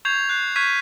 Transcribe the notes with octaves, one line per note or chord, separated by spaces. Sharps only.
C#6 G6 G#6 C7 F7
F#6 C7
C#6 F6 G6 G#6 B6 D#7